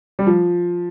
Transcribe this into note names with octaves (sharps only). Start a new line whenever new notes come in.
G3
F3